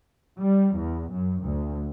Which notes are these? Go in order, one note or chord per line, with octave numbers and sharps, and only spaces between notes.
G3
E2
F#2
D2